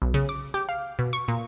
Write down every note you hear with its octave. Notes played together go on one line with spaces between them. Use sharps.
B1
C#3
D6
G4
F5
B2
C#6
A#2